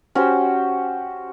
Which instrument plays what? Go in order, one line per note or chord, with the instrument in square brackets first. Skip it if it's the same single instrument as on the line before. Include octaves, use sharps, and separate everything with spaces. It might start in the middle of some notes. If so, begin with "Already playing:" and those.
[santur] C#4 F#4 G4 C5